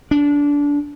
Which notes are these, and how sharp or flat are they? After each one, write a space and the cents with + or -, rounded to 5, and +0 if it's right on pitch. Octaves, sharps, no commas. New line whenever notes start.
D4 -25